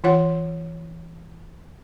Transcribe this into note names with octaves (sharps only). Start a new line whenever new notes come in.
E3 F4 C#5 F#5 C6